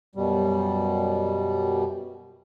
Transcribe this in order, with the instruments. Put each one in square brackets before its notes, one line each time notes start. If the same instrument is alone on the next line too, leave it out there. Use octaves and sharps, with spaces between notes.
[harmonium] F#2 B2 G3